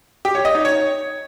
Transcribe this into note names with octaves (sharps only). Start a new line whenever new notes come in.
G4
C#5
D#5
D#4
C#5